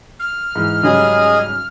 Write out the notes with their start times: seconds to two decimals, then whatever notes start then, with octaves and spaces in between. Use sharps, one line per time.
0.20 F6
0.55 G#2 E3
0.83 G#2 C#3 F#3 G3 G#4 D#5